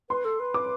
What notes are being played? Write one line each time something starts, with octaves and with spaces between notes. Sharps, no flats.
B4 C6
A4
B4
D6